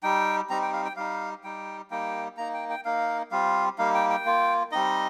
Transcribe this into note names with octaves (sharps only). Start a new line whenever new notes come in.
G3 D#4 G5
G3 C4 D#4 A#5
G5
F5
G5
G3 D#4 F5
G3 D#4 G5
G3 A#3 D#4 G5
A#3 D#4 A#5
G5
G5
A#3 D#4 F5
G3 C4 F4 F5
G3 A#3 D#4 F5
G5
G5
A#3 F4
G3 C4 D#4 D#5